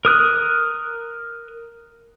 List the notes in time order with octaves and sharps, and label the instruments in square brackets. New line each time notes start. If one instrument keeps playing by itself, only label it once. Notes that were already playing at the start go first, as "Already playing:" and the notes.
[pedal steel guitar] A#4 D#6 F#6